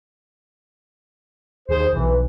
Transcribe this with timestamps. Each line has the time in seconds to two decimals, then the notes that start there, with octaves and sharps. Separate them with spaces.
1.69 D#2 G#4 C5
1.93 B1 E3